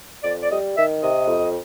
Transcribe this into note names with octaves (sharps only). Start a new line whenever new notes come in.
F2 D5
D5
G3 D#5
D#3 E5
C3 D#5
F2